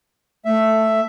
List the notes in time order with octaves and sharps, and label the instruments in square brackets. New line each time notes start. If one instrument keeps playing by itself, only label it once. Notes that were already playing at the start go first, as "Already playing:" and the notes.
[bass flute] A3 [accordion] E5